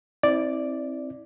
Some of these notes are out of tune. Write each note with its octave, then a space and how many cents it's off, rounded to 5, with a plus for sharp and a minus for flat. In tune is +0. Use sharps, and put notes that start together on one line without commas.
C4 +20 E4 -30 D5 +0